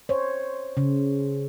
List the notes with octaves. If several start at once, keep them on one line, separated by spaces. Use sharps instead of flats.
C5 C#5
C#3